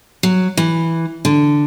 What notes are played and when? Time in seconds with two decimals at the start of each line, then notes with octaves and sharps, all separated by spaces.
0.23 F#3
0.57 E3
1.25 D3